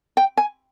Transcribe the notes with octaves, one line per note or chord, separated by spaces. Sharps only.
G5
G#5